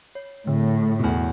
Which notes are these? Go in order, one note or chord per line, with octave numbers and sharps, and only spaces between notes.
C#5
A2 D3
E2 B2